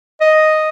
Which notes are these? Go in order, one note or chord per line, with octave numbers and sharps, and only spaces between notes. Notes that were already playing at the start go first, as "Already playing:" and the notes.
D#5